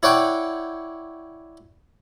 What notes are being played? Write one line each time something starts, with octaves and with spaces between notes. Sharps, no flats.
E4 C#5 D5 F#5 G5